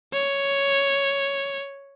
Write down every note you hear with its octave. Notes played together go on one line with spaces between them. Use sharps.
C#5